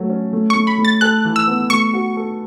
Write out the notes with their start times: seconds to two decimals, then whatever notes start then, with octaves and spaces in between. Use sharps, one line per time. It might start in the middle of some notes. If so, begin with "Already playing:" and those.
Already playing: F#3 A3
0.09 C#4
0.33 A3
0.50 A3 C#6
0.67 B5
0.78 A3
0.85 A6
1.01 A4 F#6
1.25 E3
1.36 E6
1.47 B3
1.70 A3 C#6
1.93 F#4
2.17 A4